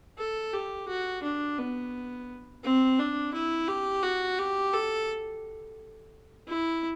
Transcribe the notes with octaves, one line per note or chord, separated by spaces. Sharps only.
A4
G4
F#4
D4
B3
C4
D4
E4
G4
F#4
G4
A4
E4